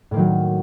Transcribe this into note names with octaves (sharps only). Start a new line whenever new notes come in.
A2 D#3 F#3 A#3